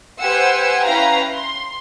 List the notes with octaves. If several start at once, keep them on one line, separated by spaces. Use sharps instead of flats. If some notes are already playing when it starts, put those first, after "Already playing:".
G4 B4 C5 F#5 G#5 E6
C#4 E4 B4 F5 G5 A#5
C6